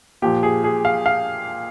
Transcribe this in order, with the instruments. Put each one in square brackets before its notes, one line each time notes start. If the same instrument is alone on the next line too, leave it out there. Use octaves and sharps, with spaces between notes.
[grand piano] A#2 F3 G4
G#4
G#4
F5
F5